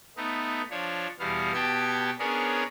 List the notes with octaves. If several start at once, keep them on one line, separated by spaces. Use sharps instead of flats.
A3 B3 D#4
F3 D4 C#5
E2 B2 G3 B3 F5
B2 B3 G4 G5 A5 G#6
B3 C#4 D4 G#4 A#4 C#5